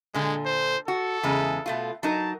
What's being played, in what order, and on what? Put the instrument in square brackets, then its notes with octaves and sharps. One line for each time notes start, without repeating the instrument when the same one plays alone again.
[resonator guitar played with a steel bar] A#2 D3 [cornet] G#3
[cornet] C5
[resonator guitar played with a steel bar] F#4 [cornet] A4
[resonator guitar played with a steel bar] E2 C#3 G#3
B2 A3 F4
[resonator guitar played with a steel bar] F#3 D#4 A#4 [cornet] A5